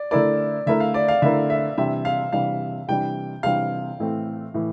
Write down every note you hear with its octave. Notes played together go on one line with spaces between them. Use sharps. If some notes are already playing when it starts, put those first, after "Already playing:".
Already playing: D5
D3 A3 E4 A#4 D5
D3 A3 E4 A#4 E5
F5
D5
F5
D3 A3 E4 A#4 E5
E5
C3 E3 G3 D4 E5
F5
C3 E3 G3 D4 F5
C3 E3 G3 D4 G5
C3 E3 G3 D4 F5
A2 E3 A3 C4
A2 E3